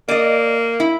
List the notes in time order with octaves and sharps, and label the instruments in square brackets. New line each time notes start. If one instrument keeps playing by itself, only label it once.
[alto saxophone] A#3 [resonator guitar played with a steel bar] D5 D#5
[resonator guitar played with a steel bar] E4